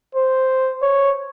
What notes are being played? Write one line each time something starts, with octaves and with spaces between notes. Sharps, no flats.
C5
C#5